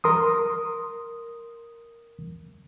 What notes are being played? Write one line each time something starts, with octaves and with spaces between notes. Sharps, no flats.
A#4 C6 D#6